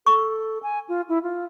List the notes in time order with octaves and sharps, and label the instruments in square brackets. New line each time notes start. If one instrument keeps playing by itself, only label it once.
[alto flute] A4 [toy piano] C#6
[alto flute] G#5
F4
E4
F4